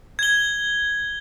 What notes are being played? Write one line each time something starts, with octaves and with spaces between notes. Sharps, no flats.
G#6 G7